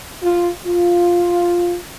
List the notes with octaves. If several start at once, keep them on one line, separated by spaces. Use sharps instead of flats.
F4
F4